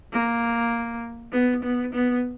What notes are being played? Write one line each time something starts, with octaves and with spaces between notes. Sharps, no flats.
A#3
B3
B3
B3